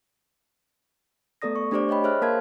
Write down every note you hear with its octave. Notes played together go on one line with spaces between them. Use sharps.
A3 B3 A4 D5 D#6 A#6
C#6
A3 D4 G4 C5 D5 D6
C#5 D#5 G5 B5
G#4 C5 C#5 E5 F6 F#6
A#3 A#4 F5 A5 C6 G#6